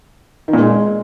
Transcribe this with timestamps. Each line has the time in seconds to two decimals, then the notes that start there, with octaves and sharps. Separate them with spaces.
0.48 D#3
0.53 A#2
0.59 G#3